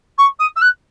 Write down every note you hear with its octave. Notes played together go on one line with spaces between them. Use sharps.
C#6
D#6
E6
F#6